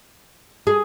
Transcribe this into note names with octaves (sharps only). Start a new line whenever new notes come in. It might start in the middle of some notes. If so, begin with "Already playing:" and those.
G#4